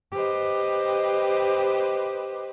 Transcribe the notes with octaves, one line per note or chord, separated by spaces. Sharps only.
G4 B4 C5 D#5